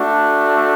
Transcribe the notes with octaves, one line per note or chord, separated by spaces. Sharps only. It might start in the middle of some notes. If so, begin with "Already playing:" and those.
Already playing: A3 D4 F#4